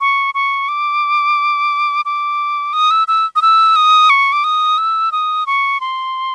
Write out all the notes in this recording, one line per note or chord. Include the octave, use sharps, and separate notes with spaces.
C#6
C#6
D6
D6
D#6
E6
E6
D#6
E6
D#6
C#6
D6
D#6
E6
D#6
C#6
C6